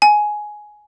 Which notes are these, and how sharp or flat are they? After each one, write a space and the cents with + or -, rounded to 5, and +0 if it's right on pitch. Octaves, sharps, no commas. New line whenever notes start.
G#5 +10